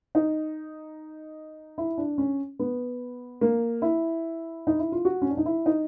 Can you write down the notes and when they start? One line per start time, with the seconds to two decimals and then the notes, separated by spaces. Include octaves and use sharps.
0.15 D#4
1.78 E4
1.98 D4
2.18 C#4
2.59 B3
3.41 A#3
3.82 E4
4.67 D#4
4.79 E4
4.92 F4
5.05 F#4
5.22 C#4
5.29 D4
5.37 D#4
5.46 E4
5.66 D#4